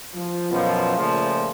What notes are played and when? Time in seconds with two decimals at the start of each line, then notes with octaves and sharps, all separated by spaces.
0.15 F3
0.51 F#2 B2 F3
0.96 A#2 C#3 F3 A3